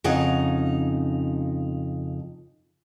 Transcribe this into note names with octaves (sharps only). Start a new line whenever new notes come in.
F2 C#3 D#4 F#5